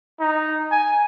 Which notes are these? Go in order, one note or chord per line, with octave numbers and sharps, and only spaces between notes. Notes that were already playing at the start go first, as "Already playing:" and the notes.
D#4
G#5